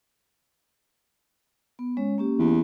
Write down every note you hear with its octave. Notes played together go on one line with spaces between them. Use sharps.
B3
G#3 C#4 C#5
A#3 C#4 G4
E2